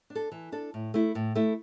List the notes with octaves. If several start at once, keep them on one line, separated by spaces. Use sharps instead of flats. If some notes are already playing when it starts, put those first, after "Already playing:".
D4
A4
E3
D4 A4
A2
A3 E4
A2
A3 E4